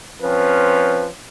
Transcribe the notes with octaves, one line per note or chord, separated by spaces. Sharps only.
F3 C4 C#4 B4